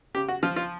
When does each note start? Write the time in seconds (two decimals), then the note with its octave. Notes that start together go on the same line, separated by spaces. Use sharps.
0.14 C#3 G4
0.28 F#4
0.43 F3 F4
0.56 F4